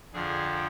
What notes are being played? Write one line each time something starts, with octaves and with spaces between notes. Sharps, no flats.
F2 D3 F3 G#4